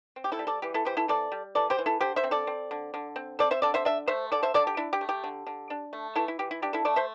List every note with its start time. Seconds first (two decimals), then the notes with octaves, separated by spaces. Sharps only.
0.16 C4
0.24 G4
0.32 E4 A4
0.39 G3
0.47 A4 D5
0.62 E3 G4
0.74 E4 A4
0.85 E3 G4 C5
0.97 E4 A4
1.08 C4 A4 D5
1.32 G3
1.55 E3 A4 D5
1.70 G4 C5
1.78 E3
1.86 E4 A4
2.00 D3 G4 C5
2.16 C5 E5
2.24 C4
2.31 A4 D5
2.47 C4
2.71 D3
2.94 D3
3.16 C4
3.39 C4 A4 D5
3.51 C5 E5
3.62 D3 A4 D5
3.74 C5 E5
3.85 D4 E5
4.07 A3 C5 E5
4.32 D3 A4 D5
4.43 C5 E5
4.54 D3 A4 D5
4.67 G4
4.77 D4 E4
4.93 G4
5.01 A3
5.09 G4
5.24 D3
5.47 D3
5.70 D4
5.93 A3
6.16 E3 E4 A4
6.28 E4
6.39 E3 G4
6.51 E4
6.62 D4 G4
6.73 E4 A4
6.85 A3 A4 D5
6.96 C5 E5